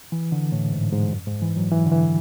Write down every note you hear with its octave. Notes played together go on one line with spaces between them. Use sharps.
E3
D3
A2
G#2
G#2
F#2
G#2
E3
F#3
E3
D3
E3